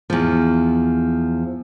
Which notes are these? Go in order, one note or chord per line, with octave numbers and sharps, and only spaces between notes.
E2 F3